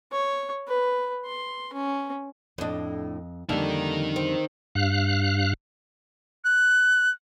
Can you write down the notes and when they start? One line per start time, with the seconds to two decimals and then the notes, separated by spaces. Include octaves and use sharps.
0.12 C#5
0.67 B4
1.26 C6
1.73 C#4
2.58 F2 A2 D4 D#5
3.49 F2 D3 G3 A#3 D4 D#4 A4 A#4
4.16 C4
4.75 G2 F5 F#6
6.45 F#6